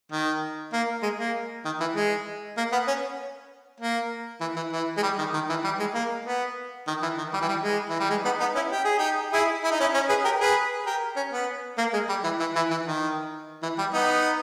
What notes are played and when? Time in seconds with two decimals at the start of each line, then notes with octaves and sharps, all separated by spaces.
0.12 D#3
0.73 A#3
1.03 G#3
1.19 A#3
1.65 D#3
1.80 E3
1.96 G#3
2.57 A#3
2.72 B3
2.87 C#4
3.80 A#3
4.41 E3
4.56 E3
4.72 E3
4.97 G#3
5.02 G3
5.18 D#3
5.34 D#3
5.49 E3
5.64 G3
5.80 G#3
5.94 A#3
6.25 B3
6.87 D#3
7.02 E3
7.18 D#3
7.34 G3
7.41 E3
7.48 G3
7.63 G#3
7.89 E3
8.00 G3
8.10 G#3
8.25 B3 D#4
8.40 B3 D#4
8.55 C#4 E4
8.71 G4
8.85 G#4
8.98 D#4 G4
9.33 E4 G#4
9.64 E4
9.71 D#4
9.80 C#4 E4
9.94 C#4
10.09 G#4 B4
10.24 G4 A#4
10.40 G#4 B4
10.86 G4 A#4
11.16 C#4
11.33 B3
11.78 A#3
11.93 G#3
12.09 G3
12.24 E3
12.40 E3
12.56 E3
12.71 E3
12.85 D#3
13.63 E3
13.78 G3
13.93 B3 D#4